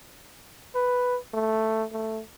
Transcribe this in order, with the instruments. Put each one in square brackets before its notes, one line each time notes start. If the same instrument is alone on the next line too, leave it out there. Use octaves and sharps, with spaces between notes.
[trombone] B4
A3
A3